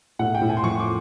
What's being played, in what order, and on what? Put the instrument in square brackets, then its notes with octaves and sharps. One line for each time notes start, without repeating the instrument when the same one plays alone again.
[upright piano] A2 F#5
G5
A2
G#5
C6
F3 C#6
D6